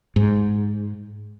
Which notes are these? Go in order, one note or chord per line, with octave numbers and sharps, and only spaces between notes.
G#2